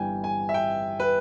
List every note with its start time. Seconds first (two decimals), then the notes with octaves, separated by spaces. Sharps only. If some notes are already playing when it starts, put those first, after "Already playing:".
Already playing: G1 G2 E3 G5 G#5
0.24 G#5
0.49 E5
0.54 G5
1.00 B4